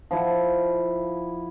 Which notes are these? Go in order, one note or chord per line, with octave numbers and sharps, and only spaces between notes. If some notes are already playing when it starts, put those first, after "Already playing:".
F3 E4 F#5